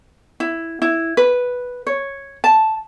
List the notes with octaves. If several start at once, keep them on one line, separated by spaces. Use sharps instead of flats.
E4
E4
B4
C#5
A5